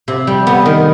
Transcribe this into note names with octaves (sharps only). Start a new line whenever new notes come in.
C3
G3
B3
D#3